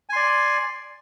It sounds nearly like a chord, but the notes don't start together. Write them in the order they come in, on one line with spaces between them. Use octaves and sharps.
G#5 C6 D5